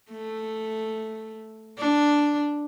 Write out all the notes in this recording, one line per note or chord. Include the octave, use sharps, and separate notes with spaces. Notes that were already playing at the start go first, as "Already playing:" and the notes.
A3
D4